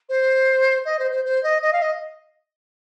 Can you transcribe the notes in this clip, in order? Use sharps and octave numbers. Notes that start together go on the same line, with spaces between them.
C5
D#5
C5
C5
C5
D#5
D#5
F5
D#5